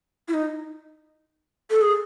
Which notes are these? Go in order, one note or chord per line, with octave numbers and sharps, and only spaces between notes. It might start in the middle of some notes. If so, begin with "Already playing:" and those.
E4
D#4
A4
G#4